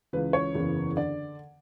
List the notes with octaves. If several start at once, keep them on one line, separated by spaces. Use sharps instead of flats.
C#2 C#3 E3 B4
C#5
F#1 E2 C#3 E3
D3 D5